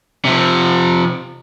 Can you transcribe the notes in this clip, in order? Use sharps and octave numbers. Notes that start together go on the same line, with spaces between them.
C3 F3